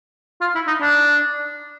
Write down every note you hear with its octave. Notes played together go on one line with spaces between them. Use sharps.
F4
E4
D#4
D4